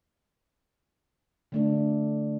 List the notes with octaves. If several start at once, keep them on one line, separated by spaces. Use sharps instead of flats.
D3 A3 D4